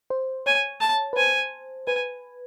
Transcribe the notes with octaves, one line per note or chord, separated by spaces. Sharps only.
C5
C#5 G#5
A5
B4
C5 G#5
B4 G#5